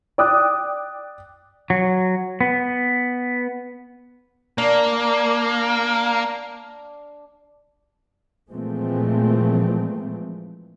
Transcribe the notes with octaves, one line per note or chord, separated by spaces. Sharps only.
D5 G5 D6 D#6 F#6
F#3
B3
A#3 D4
A#2 E3 F3 G#3 A3 C4